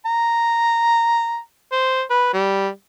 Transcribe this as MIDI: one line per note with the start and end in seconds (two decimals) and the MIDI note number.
0.06 1.39 82
1.72 2.02 72
2.10 2.29 71
2.34 2.68 55